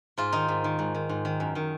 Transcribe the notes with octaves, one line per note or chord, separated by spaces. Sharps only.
G#2 F4
D#3 D#4
G#2
D#3
G#2
D#3
G#2
D#3
F#2
D#3